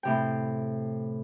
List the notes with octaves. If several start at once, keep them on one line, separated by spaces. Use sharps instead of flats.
A2 C3 G5